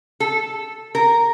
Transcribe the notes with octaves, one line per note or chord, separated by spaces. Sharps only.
A4
A#4